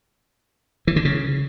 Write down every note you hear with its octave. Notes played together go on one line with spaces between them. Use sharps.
E3
D3
C#3